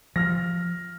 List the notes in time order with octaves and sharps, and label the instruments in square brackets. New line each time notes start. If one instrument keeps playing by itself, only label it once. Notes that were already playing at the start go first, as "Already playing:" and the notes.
[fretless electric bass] F3 [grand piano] F6 A#6